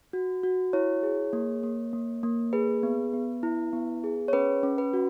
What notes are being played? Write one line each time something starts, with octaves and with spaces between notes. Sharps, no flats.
F#4
F#4
E4 C#5
G#4
A#3
A#3
A#3
A#3
G#4 B4
B3
B3
E4
B3
G#4
C#5
C#4 B4
C#4
B4
F#4